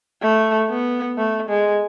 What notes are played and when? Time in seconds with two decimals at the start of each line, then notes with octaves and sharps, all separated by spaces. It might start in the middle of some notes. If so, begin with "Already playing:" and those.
0.22 A3
0.70 B3
1.17 A3
1.49 G#3